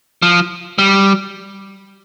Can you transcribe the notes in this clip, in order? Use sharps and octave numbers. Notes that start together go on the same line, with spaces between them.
F3
G3